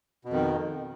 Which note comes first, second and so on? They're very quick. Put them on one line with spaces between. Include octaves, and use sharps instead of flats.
B2 F2 D#3